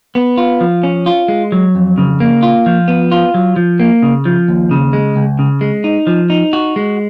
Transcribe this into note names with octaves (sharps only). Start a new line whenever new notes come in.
B3
F4
F3
C#4
F4
G#3
F#3
F2
C#3
A#3
F4
F3
B3
F4
F#3
F3
A#3
C#3
F3
D#2
C#3
G#3
C#2
C#3
G#3
D#4
F3
D#4
F#4
G#3